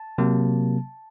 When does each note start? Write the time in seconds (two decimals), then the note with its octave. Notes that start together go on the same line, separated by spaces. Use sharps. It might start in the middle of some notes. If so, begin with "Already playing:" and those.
Already playing: A5
0.18 C3 F#3 A#3